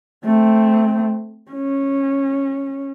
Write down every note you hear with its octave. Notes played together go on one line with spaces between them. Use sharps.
A3 C4
C#4